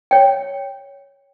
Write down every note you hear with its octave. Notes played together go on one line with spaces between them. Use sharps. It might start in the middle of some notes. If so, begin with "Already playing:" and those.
C#5 G5